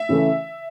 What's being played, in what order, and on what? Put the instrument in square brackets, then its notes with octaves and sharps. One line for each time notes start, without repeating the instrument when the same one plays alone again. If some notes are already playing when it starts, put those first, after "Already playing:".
Already playing: [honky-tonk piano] E5
[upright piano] C#3 E3 A3